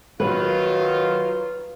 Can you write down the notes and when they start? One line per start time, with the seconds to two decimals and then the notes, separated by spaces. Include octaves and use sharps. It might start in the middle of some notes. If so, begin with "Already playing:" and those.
0.20 D#3 F#3 F4 B4